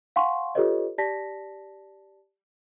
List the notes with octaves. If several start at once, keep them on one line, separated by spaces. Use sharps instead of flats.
F5 F#5 G#5 C6 C#6
F4 G4 A4 B4 C#5 D#5
G4 D5 A5 A#6 B6